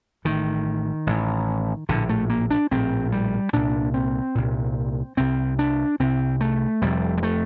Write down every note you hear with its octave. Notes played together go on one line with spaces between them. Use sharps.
A1 A2 D#3
A1 A2
A#1 A2 D3
A3
A#3
D4
A#1 A2 C4
G3
C2 A#2 D4
C4
C2 A#2
C2 C3 C4
D4
C2 C3 C4
A3
F1 F2 C3 G3
G3
A3